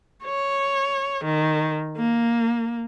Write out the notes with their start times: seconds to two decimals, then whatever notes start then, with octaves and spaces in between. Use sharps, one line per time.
0.24 C#5
1.24 D#3
1.97 A#3